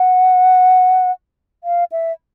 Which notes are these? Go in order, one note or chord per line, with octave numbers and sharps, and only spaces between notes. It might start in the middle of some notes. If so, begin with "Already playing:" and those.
Already playing: F#5
F5
E5